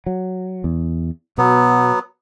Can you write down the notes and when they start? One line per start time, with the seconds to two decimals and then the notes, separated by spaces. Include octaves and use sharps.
0.06 F#3
0.64 E2
1.38 B2 F#3 B3